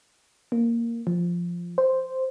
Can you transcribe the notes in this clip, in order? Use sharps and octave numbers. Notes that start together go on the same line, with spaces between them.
A#3
F3
C5